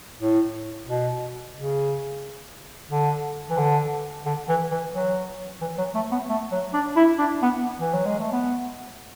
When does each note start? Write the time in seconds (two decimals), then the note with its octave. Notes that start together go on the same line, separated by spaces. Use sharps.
0.19 A2
0.87 B2
1.55 C#3
2.90 D3
3.50 E3
3.58 D3
4.26 D3
4.49 E3
4.71 E3
4.93 F#3
5.61 E3
5.78 F#3
5.95 A3
6.12 B3
6.29 A3
6.52 F#3
6.73 D4
6.96 E4
7.19 D4
7.42 B3
7.80 E3
7.93 F#3
8.06 G#3
8.19 A3
8.32 B3